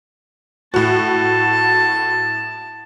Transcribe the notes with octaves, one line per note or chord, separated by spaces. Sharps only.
A2 F#4 A5